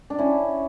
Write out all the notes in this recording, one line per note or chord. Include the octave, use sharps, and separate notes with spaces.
D4
C#4 E4